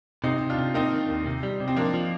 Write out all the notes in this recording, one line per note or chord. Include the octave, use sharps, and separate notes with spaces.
C3 C4 D#4
C3
D4 F4
C3
A#3 C4 D#4
D#3
D#2
C3
G3
C3
C4
F3 A#3 D4
F3